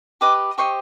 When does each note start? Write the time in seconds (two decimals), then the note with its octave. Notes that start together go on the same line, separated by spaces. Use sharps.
0.21 G4 B4 D#5 D6
0.58 G4 C5 D#5 C#6